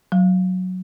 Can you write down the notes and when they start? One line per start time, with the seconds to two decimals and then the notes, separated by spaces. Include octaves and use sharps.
0.12 F#3